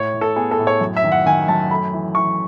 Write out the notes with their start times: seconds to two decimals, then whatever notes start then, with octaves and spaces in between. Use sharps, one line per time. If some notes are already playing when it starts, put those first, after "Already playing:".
Already playing: A2 C#5
0.14 A2
0.21 A4
0.36 B3 G#4
0.51 A4
0.59 A2
0.67 C#5
0.81 F#2
0.96 E5
1.04 D#3
1.12 F#5
1.26 D#3 G#5
1.48 F#2 A5
1.71 A3 B5
1.93 E3
2.15 E3 C#6